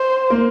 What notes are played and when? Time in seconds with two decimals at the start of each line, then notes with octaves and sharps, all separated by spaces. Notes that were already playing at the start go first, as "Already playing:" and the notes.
Already playing: C5
0.30 A#3